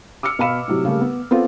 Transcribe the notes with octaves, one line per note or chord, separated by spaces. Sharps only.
D6 E6 F6 C#7
B2 F5 B5 E7
A2 C3 F#3
C#3 G3 A3 A#3
B3
B3 C4 F4 A4